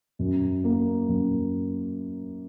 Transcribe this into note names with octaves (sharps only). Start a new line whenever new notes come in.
F#2
A#3
F#2